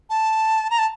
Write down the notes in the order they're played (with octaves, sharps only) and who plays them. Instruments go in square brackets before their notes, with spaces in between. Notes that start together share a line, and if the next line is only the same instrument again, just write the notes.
[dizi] A5
A#5
A5